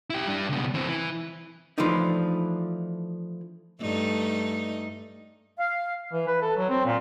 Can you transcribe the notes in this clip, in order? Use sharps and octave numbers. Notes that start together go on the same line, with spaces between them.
E4 G4
G3 D4
C#2 B2
E3 C4
E3
E3 F3 A3 D4 D#4
G2 A3 D#4
F5
E3
B4
A4
F#3
C4
A#2